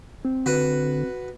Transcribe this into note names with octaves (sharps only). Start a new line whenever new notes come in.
C4
D3 F#4 B4